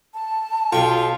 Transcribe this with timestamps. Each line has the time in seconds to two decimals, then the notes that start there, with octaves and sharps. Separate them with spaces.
0.14 A5
0.72 B1 F4 G5 C#6